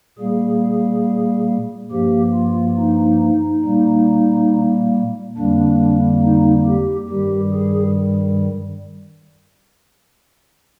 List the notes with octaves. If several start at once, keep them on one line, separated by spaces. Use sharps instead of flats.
A#2 G3 A#3 G#4
G2 F3 A#3 G4
F4
D#4
A#2 G3 A#3
F2 D3 G3 A#3 D4
D#4
G4
G2 D#3 G3 G4
G#4